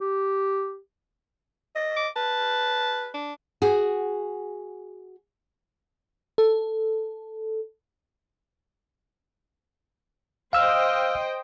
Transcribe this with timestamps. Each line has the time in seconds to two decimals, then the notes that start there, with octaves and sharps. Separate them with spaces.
0.01 G4
1.76 D#5
1.96 D6
2.16 B4 A5
3.14 D4
3.62 F#4 G#4
6.38 A4
10.53 C5 D#5 F5 G5 E6 F6